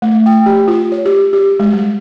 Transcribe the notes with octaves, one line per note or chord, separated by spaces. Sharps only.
A3
G5
G4
F4
C#5
G4
G4
G#3
G3